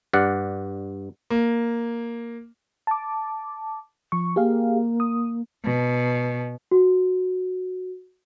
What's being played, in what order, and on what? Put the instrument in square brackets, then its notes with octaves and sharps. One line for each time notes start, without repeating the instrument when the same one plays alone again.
[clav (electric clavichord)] G2 D5 F#5
[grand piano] A#3
[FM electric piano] A5 D6
F3 C#6
[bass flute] A#3 [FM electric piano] G4 G#4 F5
[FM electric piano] D#6
[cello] B2
[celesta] F#4